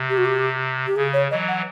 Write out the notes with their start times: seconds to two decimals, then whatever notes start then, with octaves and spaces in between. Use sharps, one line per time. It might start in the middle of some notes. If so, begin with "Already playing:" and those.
Already playing: C3
0.10 G4
0.18 F#4
0.25 G4
0.87 G4
0.96 C#3 G#4
1.13 C#5
1.31 E3 F#3 D#5
1.48 F#5